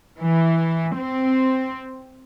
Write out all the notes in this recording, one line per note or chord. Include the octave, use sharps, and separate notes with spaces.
E3
C4